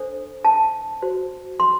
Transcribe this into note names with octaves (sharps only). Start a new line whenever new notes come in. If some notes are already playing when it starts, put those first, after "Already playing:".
Already playing: D4 A4 C5
A5
F#4 C5
C6